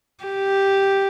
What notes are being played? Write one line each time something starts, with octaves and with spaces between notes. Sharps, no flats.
G4